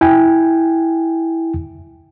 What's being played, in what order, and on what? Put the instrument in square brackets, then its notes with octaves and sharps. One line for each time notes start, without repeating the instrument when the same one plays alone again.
[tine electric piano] E4 G5 G#5